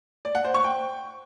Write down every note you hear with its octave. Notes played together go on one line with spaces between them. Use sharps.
D5
F#5
C5
C#6
G5